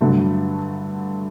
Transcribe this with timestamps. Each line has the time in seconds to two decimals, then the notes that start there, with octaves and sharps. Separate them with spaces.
0.01 G2 D3 F#3 A3